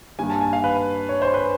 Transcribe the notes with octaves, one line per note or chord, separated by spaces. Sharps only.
G2 D#3 G3 A#3 G#5
A5
G#5
F5
B4
C#5
C5
B4